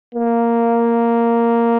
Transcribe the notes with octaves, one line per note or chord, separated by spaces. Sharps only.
A#3